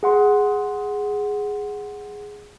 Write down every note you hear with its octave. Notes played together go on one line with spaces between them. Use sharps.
G#4 F#5 C6